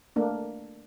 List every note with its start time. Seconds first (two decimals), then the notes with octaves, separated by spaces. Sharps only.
0.16 A3 A#3 D4